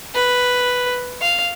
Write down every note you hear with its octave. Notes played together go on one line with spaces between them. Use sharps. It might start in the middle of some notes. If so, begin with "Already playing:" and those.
B4
F5